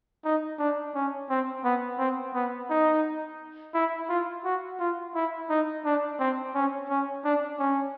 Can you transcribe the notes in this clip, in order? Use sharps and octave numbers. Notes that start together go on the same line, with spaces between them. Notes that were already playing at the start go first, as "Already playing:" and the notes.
D#4
D4
C#4
C4
B3
C4
B3
D#4
E4
F4
F#4
F4
E4
D#4
D4
C4
C#4
C#4
D4
C#4